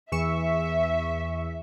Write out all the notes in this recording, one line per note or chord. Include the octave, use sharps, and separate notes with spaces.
E2 E5 C#6 E6